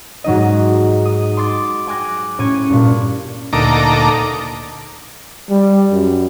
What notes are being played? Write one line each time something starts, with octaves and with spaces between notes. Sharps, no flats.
G#2 F#3 D#4 D#5
D#6
C6 D6 A6
G5 G#5 D6 F#6 A#6
A2 C#4 C#6 G#6 D#7
G2 A#2
D2 A#2 D#4 A4 A#5 D6
G3
F#2